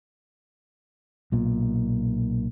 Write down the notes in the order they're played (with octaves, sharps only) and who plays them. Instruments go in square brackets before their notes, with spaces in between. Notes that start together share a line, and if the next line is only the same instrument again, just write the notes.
[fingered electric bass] B1 A#2